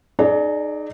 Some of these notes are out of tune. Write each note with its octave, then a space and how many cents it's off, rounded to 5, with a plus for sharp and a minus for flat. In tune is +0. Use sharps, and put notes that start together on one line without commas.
D#4 -25 G#4 +30 D5 +0